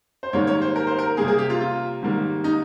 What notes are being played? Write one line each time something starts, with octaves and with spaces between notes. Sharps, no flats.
C5
G#2 D#3 G3 A#3 C#5
C#5
C5
A#4
C5
A#4
C3 G3 A#3 G#4
G#4
G4
F4
F4
G#2 D#3 G3 A#3
D#4